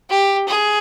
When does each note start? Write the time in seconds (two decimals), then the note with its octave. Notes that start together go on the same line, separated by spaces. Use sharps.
0.10 G4
0.48 G#4